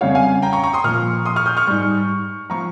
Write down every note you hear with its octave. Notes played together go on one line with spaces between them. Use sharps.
F2 C#3 G3 C#5 F5
F5 G#5
G5 A#5
A#5 C#6
A#5 C#6
C6 D#6
A#2 F3 C#6 F6
C6 D#6
C#6 F6
D#6 G6
C#6 F6
G#2 G3
F3 A#5 C#6